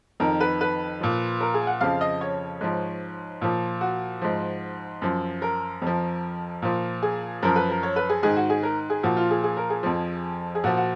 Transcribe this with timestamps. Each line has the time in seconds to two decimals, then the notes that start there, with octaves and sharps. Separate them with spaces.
0.20 F2 D#3 A#4
0.40 B4
0.61 B4
1.00 A#2 F3
1.41 A#4
1.54 G#4
1.62 G#5
1.67 F#5
1.81 F2 C#3 F3 F5
2.01 D#5
2.21 C#5
2.61 G#2 F3
3.42 A#2 F3
3.81 F#4
4.21 G#2 F3
5.02 F#2 F3
5.42 A#4
5.82 F2 F3
6.62 A#2 F3
7.02 G#4
7.42 F#2 F3 A#4
7.56 B4
7.70 A#4
7.83 C#5
7.96 B4
8.09 G#4
8.23 G#2 D#3 G#4
8.36 F#4
8.50 G#4
8.63 A#4
8.90 G#4
9.03 A#2 F3 F#4
9.17 F4
9.30 G#4
9.44 G#4
9.57 A#4
9.70 G#4
9.83 F2 F3
10.55 G#4
10.64 A#2 F3 F#4
10.77 F#4